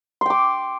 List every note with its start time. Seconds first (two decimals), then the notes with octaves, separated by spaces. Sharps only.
0.21 C6
0.26 G5
0.30 D6